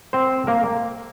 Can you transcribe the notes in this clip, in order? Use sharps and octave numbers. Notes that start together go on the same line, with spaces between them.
C4 C5
A#3 A#4